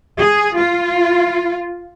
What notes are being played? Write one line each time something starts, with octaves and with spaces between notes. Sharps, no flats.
G#4
F4